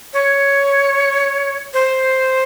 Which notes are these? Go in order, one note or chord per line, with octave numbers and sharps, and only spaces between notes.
C#5
C5